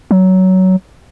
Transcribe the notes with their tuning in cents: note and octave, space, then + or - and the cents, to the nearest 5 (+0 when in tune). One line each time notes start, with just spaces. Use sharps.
F#3 +15